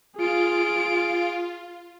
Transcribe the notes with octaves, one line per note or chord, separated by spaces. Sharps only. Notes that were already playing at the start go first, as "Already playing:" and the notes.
F4 G#4 D7